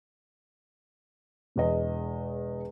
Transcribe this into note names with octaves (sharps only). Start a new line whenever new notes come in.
E1 E2 D#5